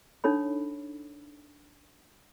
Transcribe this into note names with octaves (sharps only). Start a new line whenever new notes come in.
D4 D#4 A4 C#5 B5